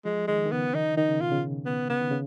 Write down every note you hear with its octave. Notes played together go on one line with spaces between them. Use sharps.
F3 G#3
D#3 G#3
D#3
C#3 B3
D#3 D#4
D#3 D#4
C#3
B2 F4
C#3
B3
C#3 B3
D#3
C#3